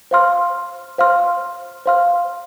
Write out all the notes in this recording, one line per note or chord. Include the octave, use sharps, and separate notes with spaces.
C5 F5 C6 F6
C5 F5 C6 F6
C5 F5 C6 F6